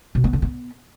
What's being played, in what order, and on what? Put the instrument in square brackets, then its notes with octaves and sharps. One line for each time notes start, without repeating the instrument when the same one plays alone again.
[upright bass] B2
B3
D3
B3